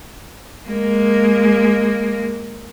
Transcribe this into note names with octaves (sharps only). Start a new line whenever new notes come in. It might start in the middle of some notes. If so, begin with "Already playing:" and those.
G#3 A#3